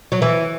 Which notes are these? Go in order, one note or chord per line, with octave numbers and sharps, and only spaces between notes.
F#3
E3